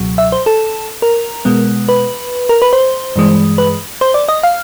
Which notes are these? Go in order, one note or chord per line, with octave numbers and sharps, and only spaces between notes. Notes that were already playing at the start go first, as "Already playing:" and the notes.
Already playing: C#2 B2 F#3
E5
C5
A4
A#4
B2 G#3 B3
B4
A#4
B4
C5
G2 E3 G#3
B4
C5
D5
D#5
F5